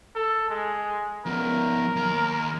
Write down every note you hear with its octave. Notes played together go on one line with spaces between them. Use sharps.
A4
G#3
F3 B3 A#4
D#2 A#5